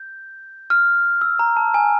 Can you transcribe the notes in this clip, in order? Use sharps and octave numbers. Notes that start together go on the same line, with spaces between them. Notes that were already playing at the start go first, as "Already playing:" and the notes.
Already playing: G6
F6
E6
A#5
A5
G#5